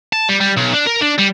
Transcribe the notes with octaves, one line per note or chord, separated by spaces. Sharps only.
A5
G3
G3
B1
D4
A#4
D4
G3